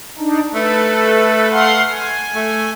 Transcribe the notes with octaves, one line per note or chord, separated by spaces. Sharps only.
D4 D#4
A3 A4 B4
F5 F#5 C6
G#5
A3